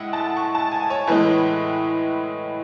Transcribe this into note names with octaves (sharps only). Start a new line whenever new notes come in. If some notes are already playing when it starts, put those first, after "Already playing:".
Already playing: A2 G#3 E5 F#5
A5
C#6
A5
G#5
C#5
A2 E3 G#3 B4